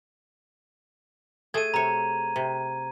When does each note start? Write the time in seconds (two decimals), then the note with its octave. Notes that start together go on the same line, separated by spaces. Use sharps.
1.54 A3 G#4 G#6 D#7
1.74 C3 C#5 A#5
2.36 C3